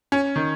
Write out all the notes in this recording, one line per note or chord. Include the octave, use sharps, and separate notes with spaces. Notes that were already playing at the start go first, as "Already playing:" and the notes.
C#4
D#3